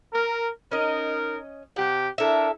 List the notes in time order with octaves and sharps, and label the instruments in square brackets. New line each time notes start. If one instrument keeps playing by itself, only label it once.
[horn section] A#4
[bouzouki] C#4 D#5 [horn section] D#4 A#4
[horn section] C3 G4 [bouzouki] F#5
[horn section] D4 E4 A#4 [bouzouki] A4 E5